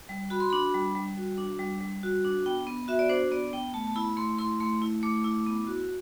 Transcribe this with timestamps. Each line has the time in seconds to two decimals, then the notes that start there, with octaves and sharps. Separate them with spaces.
0.09 G3
0.30 F#4 B5
0.40 C6
0.50 D4 B5
0.74 G3
0.95 G3
1.17 F#4
1.38 D4
1.59 G3
1.81 G3
2.03 F#4
2.25 D4
2.46 B3 G5
2.67 B3
2.88 F#4 E5
2.99 D5
3.09 D4 C5
3.31 B3 D5
3.53 B3 G5
3.74 A3 A5
3.87 A5
3.95 E4 B5
4.17 A3 C6
4.38 E4 C6
4.60 A3 C6
4.82 E4
5.03 A3 D6
5.24 E4
5.46 B3
5.67 F#4